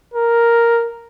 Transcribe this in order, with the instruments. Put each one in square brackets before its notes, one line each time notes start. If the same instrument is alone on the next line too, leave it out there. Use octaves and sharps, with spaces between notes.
[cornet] A#4